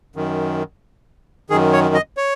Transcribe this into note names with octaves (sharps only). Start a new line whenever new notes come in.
F#2 D#3
F#2 D#3 G#4
C#5
D#5
C#5